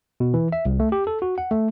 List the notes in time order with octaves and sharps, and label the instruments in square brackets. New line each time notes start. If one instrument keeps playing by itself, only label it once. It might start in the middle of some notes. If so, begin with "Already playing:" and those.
[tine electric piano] B2
E3
E5
C2
A3
G4
A4
F#4
F#5
A3